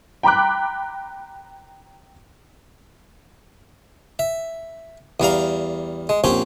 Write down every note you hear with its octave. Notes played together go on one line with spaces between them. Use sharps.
G5 A#5 B5 D6 F#6
E5
E2 G3 F5 A#5
G#3
A#1 C4 C#4 G4